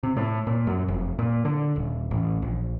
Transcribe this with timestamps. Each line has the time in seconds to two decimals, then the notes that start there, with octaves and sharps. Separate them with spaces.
0.03 C3
0.17 A2
0.47 A#2
0.67 F#2
0.88 F1
1.19 A#2
1.45 D3
1.76 D#1
2.11 A1
2.42 A#1